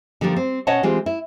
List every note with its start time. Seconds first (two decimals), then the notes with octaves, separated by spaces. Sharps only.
0.21 D3 F3 G3 G#3 A#3
0.36 C4
0.67 B2 C#4 C#5 D#5 F#5 A5
0.83 E3 G#3 C4 F4 G4
1.06 E4